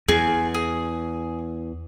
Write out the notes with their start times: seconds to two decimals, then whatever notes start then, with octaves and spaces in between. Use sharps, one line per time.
0.08 E2 G#4 G#5
0.54 G#4